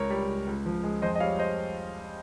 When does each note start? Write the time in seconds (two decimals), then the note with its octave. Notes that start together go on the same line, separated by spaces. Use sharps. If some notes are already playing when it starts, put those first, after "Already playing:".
Already playing: C#2 A#4 C#5
0.10 G3
0.28 C#2
0.47 C#2
0.66 F3
0.84 G#3
1.02 F2 C5 D#5
1.15 D#5
1.20 G3 C#5 F5
1.39 C5 D#5